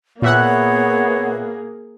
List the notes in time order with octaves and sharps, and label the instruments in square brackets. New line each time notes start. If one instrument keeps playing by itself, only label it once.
[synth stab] A#2 E5 F#5 [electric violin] A#3 G#4 [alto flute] B3 [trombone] C#5